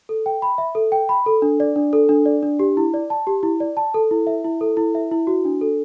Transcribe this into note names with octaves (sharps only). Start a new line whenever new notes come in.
A4
G5
B5
E5
A4
G5
B5
A4
D4
D5
D4
A4
D4
D5
D4
G4
E4
D5
A5
G4
E4
D5
A5
A4
E4
E5
E4
A4
E4
E5
E4
F#4
D4
A4